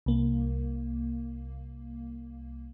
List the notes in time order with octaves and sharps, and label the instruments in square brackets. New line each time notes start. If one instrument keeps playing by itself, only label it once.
[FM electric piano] C2 A#3